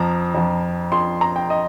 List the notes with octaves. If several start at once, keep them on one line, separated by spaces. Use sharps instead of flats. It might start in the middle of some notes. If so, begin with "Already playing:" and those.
Already playing: F2 F3 A#5
F2 F3
F2 F3 C6
A#5
G5
D#5